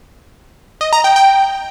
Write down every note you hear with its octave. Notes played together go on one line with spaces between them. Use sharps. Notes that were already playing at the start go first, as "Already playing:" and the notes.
D#5
A#5
G5
G5